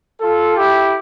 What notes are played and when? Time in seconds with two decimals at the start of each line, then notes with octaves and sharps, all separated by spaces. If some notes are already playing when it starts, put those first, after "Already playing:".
0.20 F4 A4
0.56 E4 G4